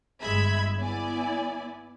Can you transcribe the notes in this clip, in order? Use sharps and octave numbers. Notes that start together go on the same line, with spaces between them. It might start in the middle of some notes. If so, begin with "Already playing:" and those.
G1 G#3 E5 B5 G#6
B3 E4 D5 G#5